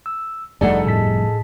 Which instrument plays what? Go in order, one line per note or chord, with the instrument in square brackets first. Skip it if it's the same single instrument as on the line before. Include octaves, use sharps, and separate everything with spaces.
[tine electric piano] E6
[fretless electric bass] F1 G2 A3 [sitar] D#4 G#4 A4 [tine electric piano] D5 F#5
[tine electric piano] A2 A5 B6